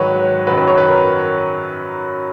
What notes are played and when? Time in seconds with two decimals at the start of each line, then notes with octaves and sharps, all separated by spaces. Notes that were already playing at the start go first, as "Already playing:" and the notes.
Already playing: G#2 D#3 F#3 B4 C#5
0.47 F#2 D#3 F#3 B4
0.57 B4
0.68 C#5
0.78 B4
0.88 A#4